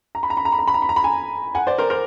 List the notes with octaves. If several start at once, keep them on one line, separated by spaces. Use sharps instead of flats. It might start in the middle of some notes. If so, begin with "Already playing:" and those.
A#5
B5
A#5
B5
A#5
B5
A#5
B5
A#5
B5
A#5
B5
G#5 A#5
F#5 G#5
C5 D5
A#4 C5
A#4 C5